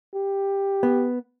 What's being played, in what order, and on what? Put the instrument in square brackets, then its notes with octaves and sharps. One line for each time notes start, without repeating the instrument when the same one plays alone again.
[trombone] G4
[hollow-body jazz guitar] B3